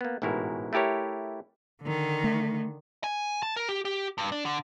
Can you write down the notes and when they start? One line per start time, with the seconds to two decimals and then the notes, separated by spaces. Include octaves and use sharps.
0.01 A#3 B3
0.22 A1 G#2 B2 E4 F#4 A#4
0.73 A3 E4 G4 A#4 C#5
1.83 D3 D#3
2.24 A3
3.04 G#5
3.43 A5
3.56 A#4
3.69 G4
3.85 G4
4.18 G2
4.32 D4
4.46 D3